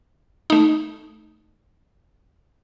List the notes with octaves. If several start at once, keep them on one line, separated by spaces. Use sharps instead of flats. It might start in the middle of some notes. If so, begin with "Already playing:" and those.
A3 D#4